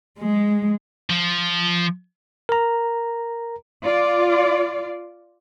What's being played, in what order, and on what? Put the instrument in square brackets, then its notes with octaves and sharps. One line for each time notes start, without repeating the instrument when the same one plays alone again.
[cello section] G#3
[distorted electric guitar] F3
[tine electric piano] A#4 A#5
[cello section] F4 D5